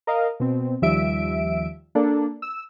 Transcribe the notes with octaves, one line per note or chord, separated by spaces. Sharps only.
A#4 D#5 F5
B2 C4
D#2 F3 G3 E5 D7
A#3 D4 A4
E6